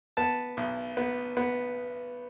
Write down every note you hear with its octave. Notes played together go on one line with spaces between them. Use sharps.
B3 A5
B1
B3
B3